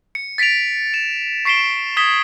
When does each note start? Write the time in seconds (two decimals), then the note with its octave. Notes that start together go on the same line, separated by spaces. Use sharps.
0.15 C#7
0.38 A6 B6 C#7 D7 F7
0.94 E7
1.45 C#6 B6 C7 D7 E7 G7
1.97 D#6 G#6 B6 E7 G7